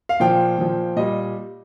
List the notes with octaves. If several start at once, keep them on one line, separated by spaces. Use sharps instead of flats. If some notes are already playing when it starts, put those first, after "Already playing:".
F5
A#2 F3 G5
A#2 F3
A#2 G3 D#5